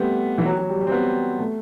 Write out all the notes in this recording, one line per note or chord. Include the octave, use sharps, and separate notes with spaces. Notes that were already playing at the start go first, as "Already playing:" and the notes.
Already playing: G3 A3 B3 C4
E3
F#3
F#3
G3
G3
C4
B3
A3